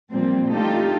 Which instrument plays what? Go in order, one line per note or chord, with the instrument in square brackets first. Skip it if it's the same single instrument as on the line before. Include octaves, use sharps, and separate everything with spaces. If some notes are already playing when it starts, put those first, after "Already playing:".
[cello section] A#2 F3 G3 A#3 C4
A3 D4 D#4 F4 G4 A4